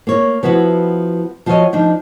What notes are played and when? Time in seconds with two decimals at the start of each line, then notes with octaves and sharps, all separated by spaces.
0.07 A#3 C#5
0.43 F3 B3 E4 F#4 B4
1.46 F3 F4 F#4 A#4 C#5 D#5
1.73 F3 D4 D#4